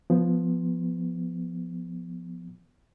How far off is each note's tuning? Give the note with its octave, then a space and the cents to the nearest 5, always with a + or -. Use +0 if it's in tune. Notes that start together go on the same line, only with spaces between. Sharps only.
F3 +0 B3 +0